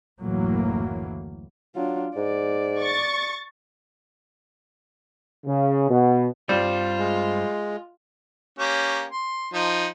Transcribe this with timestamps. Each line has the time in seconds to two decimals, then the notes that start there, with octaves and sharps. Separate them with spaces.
0.21 F#1 D2 A2 E3 F#3 A#3
1.76 F#3 D4 F4
2.16 G#2 D5
2.79 C#6 A6
5.46 C#3
5.90 B2
6.49 G2 G3 C4 F4
6.98 G#3
8.59 A#3 C#4 G4
9.12 C6
9.54 F3 D#4